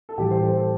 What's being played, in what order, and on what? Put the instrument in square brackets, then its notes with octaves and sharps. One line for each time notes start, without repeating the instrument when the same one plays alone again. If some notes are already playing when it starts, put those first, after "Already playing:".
[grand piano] A4
[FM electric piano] A2 E3 G3 [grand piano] G4
[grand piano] C5
C5
A4